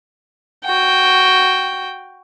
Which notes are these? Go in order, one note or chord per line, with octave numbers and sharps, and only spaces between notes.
F#4 G5